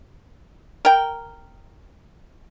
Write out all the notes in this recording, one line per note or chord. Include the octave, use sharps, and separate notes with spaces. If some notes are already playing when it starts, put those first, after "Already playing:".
A#4 G5